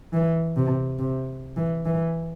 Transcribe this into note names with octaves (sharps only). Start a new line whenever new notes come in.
E3
C3
C3
E3
E3